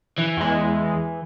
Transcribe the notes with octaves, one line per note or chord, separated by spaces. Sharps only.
E3
E2 G#3